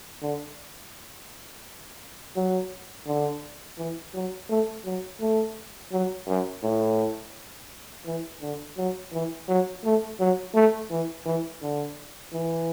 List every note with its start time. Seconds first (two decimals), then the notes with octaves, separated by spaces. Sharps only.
0.23 D3
2.36 F#3
3.07 D3
3.78 E3
4.14 F#3
4.50 A3
4.85 F#3
5.21 A3
5.93 F#3
6.28 F#2
6.63 A2
8.06 E3
8.42 D3
8.77 F#3
9.12 E3
9.48 F#3
9.84 A3
10.20 F#3
10.55 A3
10.91 E3
11.26 E3
11.62 D3
12.33 E3